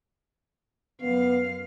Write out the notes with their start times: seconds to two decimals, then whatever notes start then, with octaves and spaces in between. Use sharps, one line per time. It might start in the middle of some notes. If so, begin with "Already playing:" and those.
1.01 F#2 B3 F5